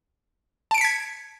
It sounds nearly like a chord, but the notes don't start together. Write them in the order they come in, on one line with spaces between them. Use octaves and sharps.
A5 D7 C#7 B6 G#6